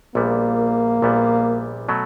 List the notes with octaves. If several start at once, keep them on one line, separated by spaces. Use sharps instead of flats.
A#1 A#2 G3 A#3 B3
A#1 A#2 G3 B3
B2 F#3 A3